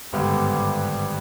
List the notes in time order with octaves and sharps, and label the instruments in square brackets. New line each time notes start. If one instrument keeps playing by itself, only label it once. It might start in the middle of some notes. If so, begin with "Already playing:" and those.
[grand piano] G#1 G2 D3 G3 B3